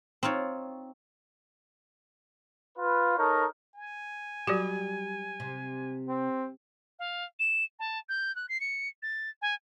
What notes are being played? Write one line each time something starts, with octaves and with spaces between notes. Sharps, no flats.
C4 D#4 F4 C#5
F4 B4
D#4 A4 A#4 C#5
G#5
F#3 G3 F#4 G4
C3
C4
F5
E7
A5
G6
F#6
C7
C#7
A6
G#5